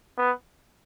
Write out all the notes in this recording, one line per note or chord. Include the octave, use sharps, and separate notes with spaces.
B3